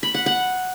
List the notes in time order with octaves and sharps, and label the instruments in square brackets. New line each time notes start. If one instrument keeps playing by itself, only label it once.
[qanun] B5
F#5
F#5